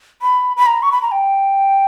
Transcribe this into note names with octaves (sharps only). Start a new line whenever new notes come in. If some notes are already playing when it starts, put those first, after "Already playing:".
B5
B5
A#5
C#6
B5
A#5
G5